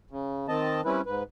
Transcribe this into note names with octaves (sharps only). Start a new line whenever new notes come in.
C#3
D#3 C4 D#5 A5
G3 C4 C#4 E4 B4
G#2 B4